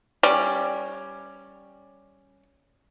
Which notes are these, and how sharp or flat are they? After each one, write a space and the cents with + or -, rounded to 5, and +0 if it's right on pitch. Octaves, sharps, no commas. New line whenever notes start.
G3 +0 C#4 +0 D5 +5